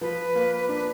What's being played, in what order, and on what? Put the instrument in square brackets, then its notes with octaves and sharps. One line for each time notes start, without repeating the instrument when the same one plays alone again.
[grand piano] F3 [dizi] B4
[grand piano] A#3
D4